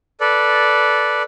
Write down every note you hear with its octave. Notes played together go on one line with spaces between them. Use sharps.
A4 B4 D5